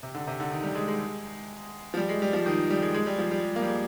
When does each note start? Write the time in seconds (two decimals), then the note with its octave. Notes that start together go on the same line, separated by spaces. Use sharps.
0.03 C3
0.15 D3
0.27 C3
0.40 D3
0.52 D#3
0.64 G3
0.75 G#3
0.88 G#3
1.94 F3
1.97 G3
2.09 G#3
2.22 G3
2.33 F3
2.46 D#3
2.70 G3
2.82 G#3
2.94 G#3
3.06 G3
3.19 F3
3.31 G3
3.56 A#3
3.62 G3
3.68 G#3